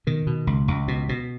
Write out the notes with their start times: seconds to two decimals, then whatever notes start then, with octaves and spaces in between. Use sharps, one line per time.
0.07 B2 D#3
0.27 B2
0.47 C#2
0.68 C#2
0.88 B2
1.09 B2